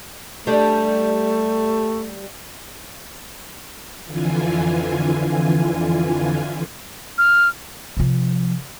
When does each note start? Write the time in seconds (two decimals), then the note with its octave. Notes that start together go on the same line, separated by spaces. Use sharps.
0.47 G3 A3 D4
4.06 F2 D3 E3 F4 G#5
7.18 F6
7.97 C3 F3